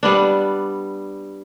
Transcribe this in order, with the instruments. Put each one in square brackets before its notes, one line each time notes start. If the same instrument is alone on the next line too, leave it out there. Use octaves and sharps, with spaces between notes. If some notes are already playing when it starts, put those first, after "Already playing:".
[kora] G3 B3 D4